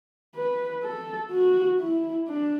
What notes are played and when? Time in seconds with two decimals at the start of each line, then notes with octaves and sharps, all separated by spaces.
0.36 B4
0.83 A4
1.31 F#4
1.79 E4
2.28 D4